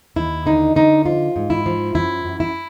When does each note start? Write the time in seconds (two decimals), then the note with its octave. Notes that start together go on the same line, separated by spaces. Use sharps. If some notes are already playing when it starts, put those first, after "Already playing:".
0.16 D#2 E4
0.46 D3 D#4
0.76 D3 D#4
1.05 F3 F4
1.36 G#2
1.50 E4
1.66 F3
1.95 F#2 E4
2.25 F#2
2.40 E4